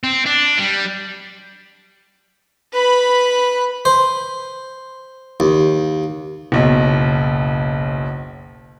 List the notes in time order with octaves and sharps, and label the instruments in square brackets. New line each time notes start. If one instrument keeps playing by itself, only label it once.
[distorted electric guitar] C4
D4
G3
[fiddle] B4 B5
[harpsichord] C5
D#2
[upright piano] F#1 B1